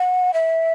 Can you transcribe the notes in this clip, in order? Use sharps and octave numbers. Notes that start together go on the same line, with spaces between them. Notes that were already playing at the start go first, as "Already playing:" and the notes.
Already playing: F#5
E5